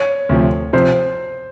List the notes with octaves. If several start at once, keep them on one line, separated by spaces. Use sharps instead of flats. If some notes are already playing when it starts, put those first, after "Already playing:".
Already playing: C#5
D2 C3 F3
C3 F3 C5